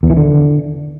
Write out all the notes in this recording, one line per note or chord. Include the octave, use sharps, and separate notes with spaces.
E2
E3
D3